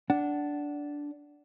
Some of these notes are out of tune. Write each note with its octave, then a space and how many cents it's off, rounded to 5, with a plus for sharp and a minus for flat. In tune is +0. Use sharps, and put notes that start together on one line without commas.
D4 -10 F#5 +20